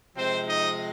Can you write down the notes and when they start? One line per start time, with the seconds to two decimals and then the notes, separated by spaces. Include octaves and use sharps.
0.16 C3 F3 G#3 C4 C5
0.48 D#4 D#5